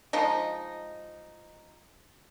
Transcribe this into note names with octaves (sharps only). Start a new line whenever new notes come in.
F3 G#3 D#4